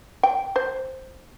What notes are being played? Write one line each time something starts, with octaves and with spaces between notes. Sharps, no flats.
G5
C5